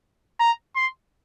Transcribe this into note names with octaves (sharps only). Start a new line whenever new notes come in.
A#5
C6